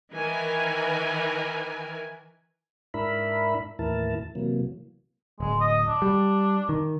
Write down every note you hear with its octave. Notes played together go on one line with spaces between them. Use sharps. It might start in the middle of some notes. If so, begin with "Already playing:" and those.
D#3 E3 A#4 B4 G#5
G#2 D4 E4 A#4 E5 B5
D#2 A2 E3 E4 A#4 A5
C3 E3 F#3 A#3
D1 G#3
D#5
D4
G3
D#3